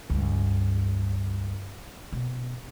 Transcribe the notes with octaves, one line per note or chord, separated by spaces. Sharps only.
C#2 G2
B2